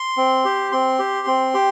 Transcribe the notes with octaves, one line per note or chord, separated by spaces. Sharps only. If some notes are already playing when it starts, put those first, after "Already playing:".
Already playing: C6
C4
G4
C4 C6
G4
C4
G4